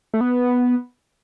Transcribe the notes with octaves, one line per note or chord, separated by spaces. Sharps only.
A3
B3